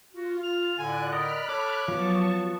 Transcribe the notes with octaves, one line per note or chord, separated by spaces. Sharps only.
F4 F#4
F6
A2 D3 D5 G#5 F#6
A#4 D5 D#5 B5 F6 F#6
A4 C#5 D6
F3 F#3 B3 A5 C#6